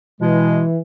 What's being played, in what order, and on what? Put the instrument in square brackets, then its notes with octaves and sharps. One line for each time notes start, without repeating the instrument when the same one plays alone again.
[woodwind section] B2 G#3 [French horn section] E3